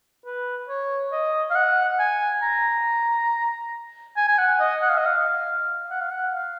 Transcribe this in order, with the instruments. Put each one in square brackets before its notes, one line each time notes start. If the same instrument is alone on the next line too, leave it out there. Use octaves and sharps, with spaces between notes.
[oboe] B4
C#5
D#5
F5
F#5
G#5
A#5
G#5
G#5
F#5
D#5
F#5
F5
D#5
F5
F#5
F5
F#5
F5